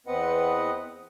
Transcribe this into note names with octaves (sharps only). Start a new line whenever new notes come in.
E2 B3 C4 B4 D#5 F#5